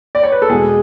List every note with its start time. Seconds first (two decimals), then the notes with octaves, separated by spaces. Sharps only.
0.15 D5
0.23 C#5
0.32 B4
0.42 A4
0.49 E2 B2 G#3 G#4